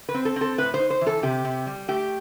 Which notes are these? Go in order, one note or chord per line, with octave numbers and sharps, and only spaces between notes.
B4
C4
A4
C4
A4
A2 B4
C5
D#4
C5
E3
A4
C3 G4
C3
G3
A3 G4